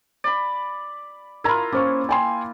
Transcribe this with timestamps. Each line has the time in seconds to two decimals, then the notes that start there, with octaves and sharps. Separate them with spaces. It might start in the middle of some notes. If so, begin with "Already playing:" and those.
0.24 D5 B5
1.44 E4 F4 A#4 A#5 B5
1.72 A#3 C#4 C5 C#6
2.09 G5 G#5 C6